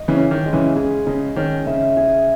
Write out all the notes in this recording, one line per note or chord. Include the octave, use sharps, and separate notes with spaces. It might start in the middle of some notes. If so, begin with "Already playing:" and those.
Already playing: D#5
C#3 E3
C#4
D#3
G#3
C#3 E3
C#3 G#4
C#3 D#5
D#3 C#4
C#3 E5
G#4